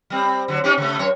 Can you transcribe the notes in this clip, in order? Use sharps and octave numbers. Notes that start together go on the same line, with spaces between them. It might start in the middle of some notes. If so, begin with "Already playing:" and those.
G3 C4
D3 F#3
C#4 D#4 G4
C#3 A3
F#2 C#5